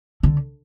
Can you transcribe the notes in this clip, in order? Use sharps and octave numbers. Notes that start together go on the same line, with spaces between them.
D3